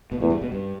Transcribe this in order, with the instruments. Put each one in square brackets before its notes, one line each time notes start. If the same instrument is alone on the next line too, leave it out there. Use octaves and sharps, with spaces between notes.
[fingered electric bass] B2
[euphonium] E2 [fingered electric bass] A2
[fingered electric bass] G2
B2
G2